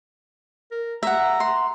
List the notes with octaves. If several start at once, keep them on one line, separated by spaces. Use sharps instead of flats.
A#4
E5 F#5 A#5
C6